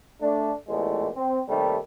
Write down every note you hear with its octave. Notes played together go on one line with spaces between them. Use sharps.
A3 D4
A1 E2 A#2 G#3 A3
C4
D#2 C3 D#3 G3 A3